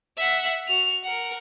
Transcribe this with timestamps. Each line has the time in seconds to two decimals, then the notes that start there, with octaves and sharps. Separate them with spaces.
0.16 E5 F#5
0.68 F#4 F7
1.04 A#4 F#5